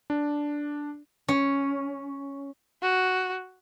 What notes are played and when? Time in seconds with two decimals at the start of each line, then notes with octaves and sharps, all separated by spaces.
0.10 D4
1.28 C#4
2.82 F#4